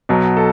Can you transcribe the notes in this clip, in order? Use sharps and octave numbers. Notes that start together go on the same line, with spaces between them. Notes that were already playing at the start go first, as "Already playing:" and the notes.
B1 B2 F#3
A4